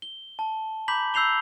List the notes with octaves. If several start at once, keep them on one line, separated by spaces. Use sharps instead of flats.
G7
A5
A#5 B5 D6 G6 B6 F#7
B5 E6 G6 C7 F7 G7